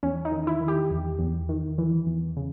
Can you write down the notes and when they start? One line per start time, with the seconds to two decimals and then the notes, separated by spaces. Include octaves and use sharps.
0.03 E2 C#4
0.25 D#4
0.32 D#3
0.47 E4
0.61 D#3
0.68 G4
0.91 E2
1.19 E2
1.49 D#3
1.78 E3
2.07 E2
2.37 C#3